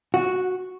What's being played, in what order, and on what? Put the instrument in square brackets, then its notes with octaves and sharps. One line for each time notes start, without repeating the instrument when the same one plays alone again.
[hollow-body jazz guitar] F#4